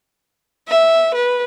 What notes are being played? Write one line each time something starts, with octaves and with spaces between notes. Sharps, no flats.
E5
B4